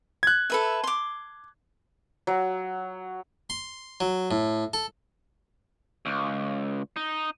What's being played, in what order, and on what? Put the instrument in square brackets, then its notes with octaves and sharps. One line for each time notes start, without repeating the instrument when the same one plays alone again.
[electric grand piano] F#6 G#6
[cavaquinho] A4 B4 E5
C6 D6
[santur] F#3
[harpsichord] C6
F#3
A2
A4
[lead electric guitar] C#2
D#4